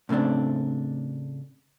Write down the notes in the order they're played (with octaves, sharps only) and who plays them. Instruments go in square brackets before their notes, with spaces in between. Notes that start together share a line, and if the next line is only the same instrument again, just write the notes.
[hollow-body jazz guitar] A2 C#3 A3 C4 D4